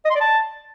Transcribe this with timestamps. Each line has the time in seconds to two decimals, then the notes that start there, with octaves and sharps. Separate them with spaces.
0.05 D#5
0.11 C6
0.16 D5
0.21 A5